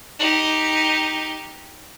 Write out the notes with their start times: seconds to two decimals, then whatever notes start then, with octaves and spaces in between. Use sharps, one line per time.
0.19 D#4 G4